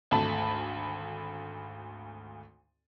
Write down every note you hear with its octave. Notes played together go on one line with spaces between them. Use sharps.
G#1 D2 A3 A5 B5